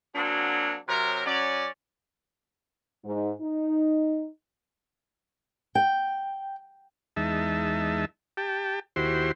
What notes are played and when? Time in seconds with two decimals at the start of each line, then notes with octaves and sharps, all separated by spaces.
0.15 F#3 A#3 C4 D4 F#4 G#4
0.89 C3 F#3 A#4
1.26 F#3 C#4 D5
3.05 G#2
3.41 D#4
5.75 G5
7.16 E2 G#3 D#4 E5 A5
8.37 G4 G5 A5
8.96 D#2 E4 F#4 G4 C5 C6